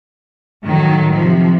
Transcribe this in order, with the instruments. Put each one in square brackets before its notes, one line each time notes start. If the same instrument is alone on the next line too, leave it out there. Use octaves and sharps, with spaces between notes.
[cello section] A2 D#3 F#3
C3 F3